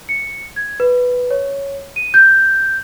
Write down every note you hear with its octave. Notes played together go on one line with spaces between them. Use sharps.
C#7
G#6
B4
C#5
D#7
G6